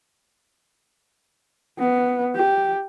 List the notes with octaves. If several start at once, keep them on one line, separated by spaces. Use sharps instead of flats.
B3
G4